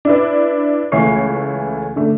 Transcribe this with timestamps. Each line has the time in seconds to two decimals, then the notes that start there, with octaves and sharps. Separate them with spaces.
0.05 D4 E4 B4
0.92 C#2 E3 A3 C#5 C#6 C7
1.96 D3 A3